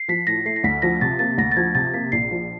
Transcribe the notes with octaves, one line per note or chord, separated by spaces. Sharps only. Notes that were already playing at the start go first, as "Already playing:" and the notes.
Already playing: C7
F3 B6
A2 A#6
A3 C7
A#6
D2 B6
F3 A#6
C3 A6
A#3 A6
D2 A#6
A6
F3 G#6
C3 A6
A#3 B6
A#1 C7
F3